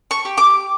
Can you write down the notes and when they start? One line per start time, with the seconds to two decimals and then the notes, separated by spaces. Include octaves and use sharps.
0.11 C#6
0.25 G4
0.38 D6